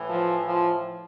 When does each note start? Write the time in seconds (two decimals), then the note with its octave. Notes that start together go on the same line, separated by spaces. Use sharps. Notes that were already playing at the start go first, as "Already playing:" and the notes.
Already playing: A2 E3
0.10 F3
0.46 F3